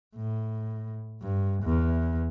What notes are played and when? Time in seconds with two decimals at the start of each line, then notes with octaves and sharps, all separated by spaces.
0.17 A2
1.22 G2
1.63 E2